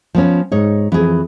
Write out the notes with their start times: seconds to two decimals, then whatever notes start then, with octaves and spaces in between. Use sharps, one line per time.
0.15 F3 B3 C#4
0.52 G#2 D#4 C#5
0.92 F2 E3 G#4